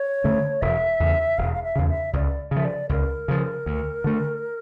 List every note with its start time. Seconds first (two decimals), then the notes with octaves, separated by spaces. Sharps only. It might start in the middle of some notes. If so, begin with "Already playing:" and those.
Already playing: C#5
0.24 D3 A3 C#4
0.62 E1 E5
1.00 E2 C#3
1.38 E1 F5
1.53 F5
1.63 E5
1.76 E2 C#3 F5
1.88 E5
2.13 C#2 D5
2.51 C#3 F3 E5
2.65 D5
2.89 C#2 A#4
3.28 C#3 F3
3.66 D2
4.04 D3 A3